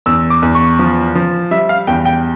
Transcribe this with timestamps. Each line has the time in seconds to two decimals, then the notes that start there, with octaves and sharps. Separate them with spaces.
0.06 E2 E6
0.30 D6
0.42 E2
0.55 C#6
0.79 F3
1.15 F3
1.51 G3 E5
1.69 F5
1.87 E2 G5
2.05 G5